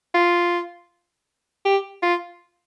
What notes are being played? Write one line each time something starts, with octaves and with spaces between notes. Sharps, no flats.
F4
G4
F4